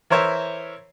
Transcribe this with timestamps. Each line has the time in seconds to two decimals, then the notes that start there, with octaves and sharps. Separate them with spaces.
0.10 E3 A#4 C5 C#5 E5